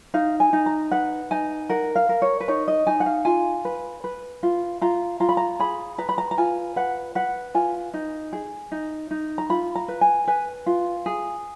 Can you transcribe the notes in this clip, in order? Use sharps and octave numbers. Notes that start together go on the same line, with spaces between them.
D#4 F5
G#5
D#4
A#5
B4 F#5
D#4 G#5
A#4 F#5
F5
A#4
C#5
B4
D#4 C#5
D#5
D#4 G#5
F#5
F5
F4 G#5
B4
B4
F4
F4 A#5
F4 A#5
B5
A#5
G#4 B5
B4 A#5
B5
A#5
A#5
F4 G#5
B4 F#5
B4 F#5
F4 G#5
D#4
G#4
D#4
D#4
A#5
F4 B5
A#5
B4
G#5
B4 G#5
F4
G#4